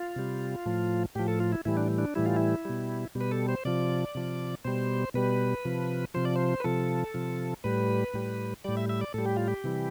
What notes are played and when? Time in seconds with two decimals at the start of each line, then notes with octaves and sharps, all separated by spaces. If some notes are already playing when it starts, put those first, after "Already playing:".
Already playing: F4
0.16 C3 G3
0.66 A2 F3
1.15 A2 F3 G4
1.28 A4
1.40 F4
1.52 E4
1.65 A2 E3 G3 E4
1.77 D4
1.98 D4
2.15 A2 E3 G3 E4
2.26 F4
2.36 E4
2.65 B2 G3
3.15 B2 G3
3.21 B4
3.31 A4
3.48 C5
3.65 C3 F3 D5
4.15 C3 F3
4.65 B2 G3 C5
5.14 B2 G3 B4
5.65 C3 F3
6.14 C3 F3 C5
6.25 D5
6.36 C5
6.60 B4
6.64 C3 F3 A4
7.14 C3 F3
7.64 A2 G3 B4
8.14 A2 G3
8.64 A2 G3 D5
8.77 E5
8.89 E5
9.01 D5
9.14 A2 G3 A4
9.26 G4
9.36 F4
9.48 G4
9.64 C3 E3 G3